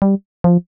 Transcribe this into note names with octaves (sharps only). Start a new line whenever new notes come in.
G3
F3